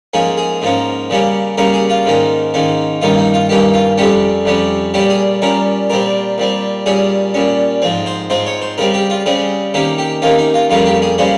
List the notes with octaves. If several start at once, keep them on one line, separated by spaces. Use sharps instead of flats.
G#2 F3 A#3 C#4 G#4
G#4
G#2 F3 A#3 C#4
C#3 G3 A#3 C#4
C#3 G3 A#3 C#4 A#4
G#4
F4
G#2 D#3 A#3 C#4
G#2 D#3 A#3 C#4
G2 D#3 A#3 C#4 F4
D#4
F4
G2 D#3 A#3 C#4 G4
F4
F2 C3 G3 C#4 G4
F2 C3 G3 C#4
A#2 G3 C#4 G4
G#4
A#2 G3 C#4 A#4
A#2 G3 C4 A#4
A#2 G3 C4
A#2 G3 C#4 G#4
A#2 G3 C#4
G#2 F3 C4
C5
G#2 F3 C4 C5
C#5
C5
C#3 G3 C4 A#4
G4
F4
C#3 G3 C4 G#4
C3 D#3 A#3 C#4 G4
G4
C3 D#3 A#3 C#4 F4
D#4
F4
F2 C#3 G3 A#3 C#4 F4
G4
G#4
C#3 G3 A#3 C#4 C5